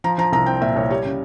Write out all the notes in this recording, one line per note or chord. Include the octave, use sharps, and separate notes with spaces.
F3 A#5
F3 A#5
C2 A#5
C4 G5
A#2 E5
C2 C#5
G3 C#5
C#3